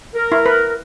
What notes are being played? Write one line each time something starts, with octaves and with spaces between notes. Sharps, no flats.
A#4
E4
B4